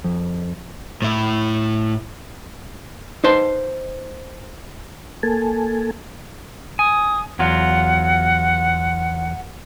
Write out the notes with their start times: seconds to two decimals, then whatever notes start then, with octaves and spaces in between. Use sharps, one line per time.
0.04 F2
1.02 A2 E4
3.24 D#4 B4 C5 A5 C6
5.23 A#3 A4 G#5 A5
6.79 G#5 D#6
7.39 E2 F#3 F4 F#5